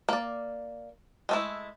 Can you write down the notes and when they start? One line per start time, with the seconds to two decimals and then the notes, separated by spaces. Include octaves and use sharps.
0.09 A#3 D5
1.29 G#3 A3 E4